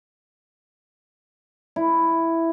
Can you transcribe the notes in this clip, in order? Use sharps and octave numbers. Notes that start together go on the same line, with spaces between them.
E4